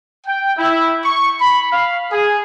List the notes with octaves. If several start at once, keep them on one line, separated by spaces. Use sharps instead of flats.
G5
E4
C#6
B5
F5
G#4